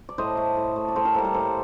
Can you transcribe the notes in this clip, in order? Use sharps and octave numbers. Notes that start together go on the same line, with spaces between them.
D5
A2 C5 D#5
A3
A2
A3
D5
A2 A4 C5
G4 A#4
G3 A#3 A4 C5
A#4 D5
A2 A4 C5